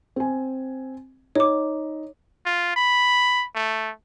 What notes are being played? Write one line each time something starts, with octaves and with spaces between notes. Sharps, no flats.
C4 G#5
D#4 C#5 D6
F4
B5
A3